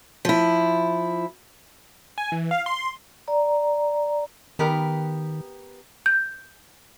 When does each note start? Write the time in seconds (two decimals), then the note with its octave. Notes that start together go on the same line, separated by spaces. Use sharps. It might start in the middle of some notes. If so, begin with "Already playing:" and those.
0.25 F3 E4
2.18 G#5
2.32 E3
2.51 F5
2.66 C6
3.28 D5 A#5
4.59 D#3 B3 G4 A#4
6.06 G6